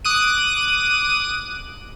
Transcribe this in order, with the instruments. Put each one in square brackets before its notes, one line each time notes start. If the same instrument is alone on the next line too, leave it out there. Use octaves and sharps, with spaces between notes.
[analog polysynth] D6 D#6 F#6 D#7